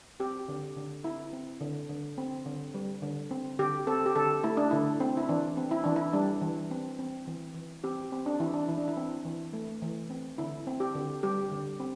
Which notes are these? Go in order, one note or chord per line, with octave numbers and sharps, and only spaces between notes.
C4 G4
D3
D3
C4 E4
C4
D3
D3
C4
D3
G3
D3
C4
D3 G4
C4 A4
G4
D3 A4
A3 E4
D4
D3 E4
C4
E4
E3 D4
C4
E4
E3 D4
E4
G3 D4
E3
C4
C4
E3
E3
C4 G4
C4
D4
E3 E4
D4
E3 E4
D4
E4
C4
E3
A3
E3
C4
D3 E4
C4
G4
D3
G3 G4
D3
C4